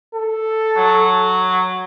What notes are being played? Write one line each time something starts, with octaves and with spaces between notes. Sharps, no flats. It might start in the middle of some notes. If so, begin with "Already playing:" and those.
A4
F#3